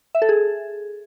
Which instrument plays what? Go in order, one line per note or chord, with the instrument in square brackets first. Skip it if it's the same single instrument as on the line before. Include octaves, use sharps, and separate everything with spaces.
[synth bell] E5
A4
G#4